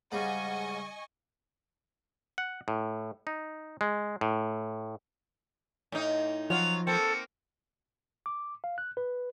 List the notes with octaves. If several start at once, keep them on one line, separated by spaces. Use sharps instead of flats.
G#2 C#3 G3 D#5 F#5 G#5 C#6
F#5
A2
D#4
G#3
A2
A2 D#4
F3 F#3 F4 F7
A#3 C4 A4 C#7
D6
F5
F#6
B4